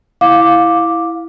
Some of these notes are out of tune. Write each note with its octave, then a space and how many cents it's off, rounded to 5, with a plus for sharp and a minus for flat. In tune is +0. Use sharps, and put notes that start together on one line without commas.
E4 +0 F5 +15 D6 +0